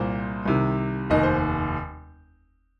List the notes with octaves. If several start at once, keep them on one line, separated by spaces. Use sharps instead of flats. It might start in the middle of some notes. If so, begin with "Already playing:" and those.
Already playing: C2 A#2 C5
C2 C3 D#3
F1 D#2 D#3 D#5
C5